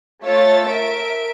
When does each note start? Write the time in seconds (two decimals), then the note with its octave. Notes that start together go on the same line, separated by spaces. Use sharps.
0.23 A3 F4 C#5 E6 A6
0.71 A#4 E5 D7